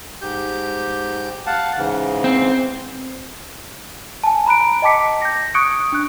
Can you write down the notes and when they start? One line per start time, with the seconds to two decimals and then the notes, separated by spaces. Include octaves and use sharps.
0.22 G#2 G4 G6
1.46 F5 F#5 A5
1.78 G#2 C#3 E3
2.24 C4
4.24 G#5 A5
4.46 A#5 B5 F#6 D7
4.82 D#5 G5 A5 D6 B6 C#7
5.22 G6 A#6
5.54 C#6 D#6 F#6 G#6 C#7 D7
5.92 D4 F#6